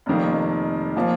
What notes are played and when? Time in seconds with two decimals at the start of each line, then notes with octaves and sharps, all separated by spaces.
0.06 F1 F2 D#3 A#3
0.96 A#2 F3 A#3